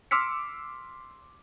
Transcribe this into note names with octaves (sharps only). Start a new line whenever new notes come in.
C6 D6 E6 F6 B6 C#7